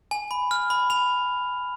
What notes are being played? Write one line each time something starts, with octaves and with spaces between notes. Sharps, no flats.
G#5
B5
F6
B5
B5 F7